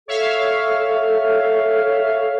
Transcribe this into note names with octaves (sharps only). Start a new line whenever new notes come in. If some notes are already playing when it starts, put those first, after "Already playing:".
A4 C#5 E5 F5